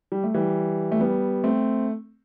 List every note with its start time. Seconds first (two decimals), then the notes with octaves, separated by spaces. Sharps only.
0.12 G3
0.24 A3
0.34 E3 G3
0.92 A3
1.00 G3 B3
1.44 A3 C4